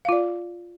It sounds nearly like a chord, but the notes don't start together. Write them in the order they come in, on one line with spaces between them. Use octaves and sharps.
F5 F4 D5